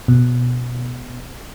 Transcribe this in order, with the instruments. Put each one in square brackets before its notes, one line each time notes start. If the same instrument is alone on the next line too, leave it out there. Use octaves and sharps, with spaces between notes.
[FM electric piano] B2